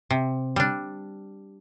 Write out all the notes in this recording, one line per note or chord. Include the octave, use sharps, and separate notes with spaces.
C3
G3 D4